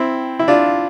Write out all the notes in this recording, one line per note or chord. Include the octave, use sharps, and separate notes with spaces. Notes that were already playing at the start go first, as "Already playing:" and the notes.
Already playing: C4 E4
E4
D4 F4